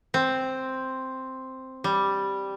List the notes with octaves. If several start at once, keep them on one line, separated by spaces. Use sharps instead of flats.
C4
G3